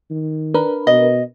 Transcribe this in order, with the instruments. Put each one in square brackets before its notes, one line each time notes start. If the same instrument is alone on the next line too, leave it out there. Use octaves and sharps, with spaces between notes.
[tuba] D#3
[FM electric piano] D4 A#4 B4
[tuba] B2 [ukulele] D#5